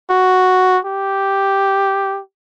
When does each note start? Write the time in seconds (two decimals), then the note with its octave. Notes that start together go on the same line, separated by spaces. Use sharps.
0.10 F#4
0.85 G4